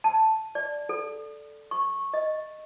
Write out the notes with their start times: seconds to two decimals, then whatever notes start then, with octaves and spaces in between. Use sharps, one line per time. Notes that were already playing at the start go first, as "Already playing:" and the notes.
0.04 A5
0.55 D5
0.89 A4
1.71 C#6
2.14 D#5